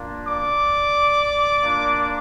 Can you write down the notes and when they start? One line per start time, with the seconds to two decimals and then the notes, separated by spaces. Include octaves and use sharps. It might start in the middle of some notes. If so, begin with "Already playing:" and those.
Already playing: A#3 D4 F4
0.28 D5 D6
1.62 A#3 D4 F4